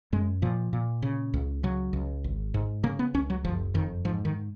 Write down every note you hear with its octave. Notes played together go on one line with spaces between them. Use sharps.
F#2 G#3
A#2 F3
A#2
C#3
C#2
C#3 F#3
C#2
G#1
G#2
C#3 A#3
B3
C#2 C#4
F#3
F#1 F3
F2 D#3
G#2 F3
D#3